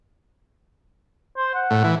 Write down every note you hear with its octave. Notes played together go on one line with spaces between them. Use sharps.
C5
F#5
A2
E3